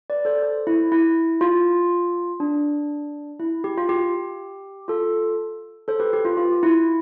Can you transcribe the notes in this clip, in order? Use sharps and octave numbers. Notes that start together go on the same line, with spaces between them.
B4 D5
A4 C5
A4 C5
E4
E4
F4
D4
E4
G4
F4
G4
F4 A4
A4 C5
G4 B4
G4
F4
F4
E4